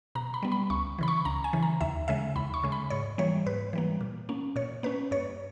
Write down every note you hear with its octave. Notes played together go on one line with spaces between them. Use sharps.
B2 A#5
B5
G3 B3
B5
C#2 C#6
C#3 E3 B5
C#6
C#2 A#5
G#5
C#3 E3
A#5
D#2 E5
C#3 G#3 E5
D#2 B5
C#6
C#3 G#3
B5
G#2 C#5
E3 G3 A#3 C#5
G#2 B4
E3 G3 A#3
A#2
A#3 C#4
A#2 C#5
A#3 C#4 B4
G2 C#5